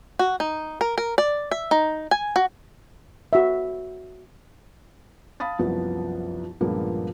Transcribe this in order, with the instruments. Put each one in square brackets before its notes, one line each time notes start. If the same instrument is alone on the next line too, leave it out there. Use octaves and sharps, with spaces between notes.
[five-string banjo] F#4
D#4
A#4
A#4
D5
E5
D#4
G#5
F#4
[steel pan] F#4 E5
[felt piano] F5 A5 B5 D#6 A6
C2 F#2 F3 B3
C#2 G2 A#2 F3 A#3 B3